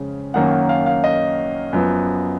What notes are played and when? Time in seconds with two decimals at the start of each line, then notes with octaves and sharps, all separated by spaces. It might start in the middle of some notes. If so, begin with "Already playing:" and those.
Already playing: F2 C#3 G#3 C#4
0.34 F#2 D#3 A#3 C#4 F#5
0.52 F#5
0.69 F5
0.86 F5
1.04 D#5
1.73 F#2 F3 B3